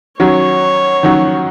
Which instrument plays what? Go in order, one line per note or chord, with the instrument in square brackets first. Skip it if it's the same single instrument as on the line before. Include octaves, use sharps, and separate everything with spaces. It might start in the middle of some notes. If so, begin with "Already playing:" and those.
[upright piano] D#3 F#3 C#4 F#4 [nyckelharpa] C#5
[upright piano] D#3 F#3 C#4 F#4